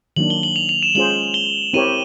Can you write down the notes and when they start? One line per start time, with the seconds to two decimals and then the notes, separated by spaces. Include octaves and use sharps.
0.16 D#3 F#3 A#3 D4 F#7
0.30 G7
0.43 F#7
0.56 F7
0.69 F7
0.83 E7
0.95 G#3 C#4 F4 G#4 C5 F#7
1.34 G7
1.73 C4 E4 G4 A#4 C#5 D#7